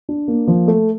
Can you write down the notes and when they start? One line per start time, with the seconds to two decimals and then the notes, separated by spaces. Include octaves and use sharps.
0.09 D4
0.28 A#3
0.48 F3
0.68 A3